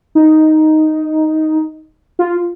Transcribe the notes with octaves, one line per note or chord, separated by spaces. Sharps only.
D#4
F4